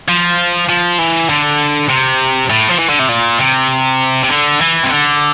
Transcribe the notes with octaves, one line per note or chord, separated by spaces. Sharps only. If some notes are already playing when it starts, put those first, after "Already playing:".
F3
F3
E3
D3
C3
A2
F3
E3
D3
C3
A#2
C3
C3
D3
E3
C3
D3